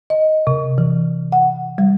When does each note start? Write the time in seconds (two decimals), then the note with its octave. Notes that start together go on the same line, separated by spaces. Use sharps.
0.10 D#5
0.47 C3
0.78 E3
1.32 F#5
1.78 G3